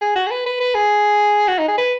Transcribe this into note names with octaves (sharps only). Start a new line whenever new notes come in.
G#4
F#4
G#4
B4
B4
B4
G#4
F#4
D#4
G#4
B4